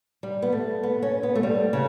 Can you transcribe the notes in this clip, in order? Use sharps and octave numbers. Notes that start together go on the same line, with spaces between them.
G3
B3
A3
B3
C#4
B3
A3
G3
C#3